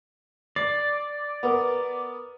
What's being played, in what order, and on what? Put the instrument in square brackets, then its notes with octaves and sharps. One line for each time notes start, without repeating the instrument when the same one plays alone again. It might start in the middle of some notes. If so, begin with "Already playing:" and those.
[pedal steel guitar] D5 [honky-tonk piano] C7
[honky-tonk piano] B3 A#4